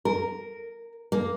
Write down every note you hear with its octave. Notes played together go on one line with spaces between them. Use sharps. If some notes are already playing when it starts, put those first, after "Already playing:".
A#4
A#3